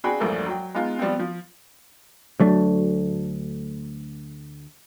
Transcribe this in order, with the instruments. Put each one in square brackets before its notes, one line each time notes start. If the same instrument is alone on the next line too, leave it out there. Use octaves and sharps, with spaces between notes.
[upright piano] C4 D4 F#4 G#4 G5 B5
E1 A#1 G2 A3 A#3 D5
F#3 G5
G#3 B3 D#4 F4
F3 G3 B3 C4
F3
[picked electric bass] D2 F#3 A3 D4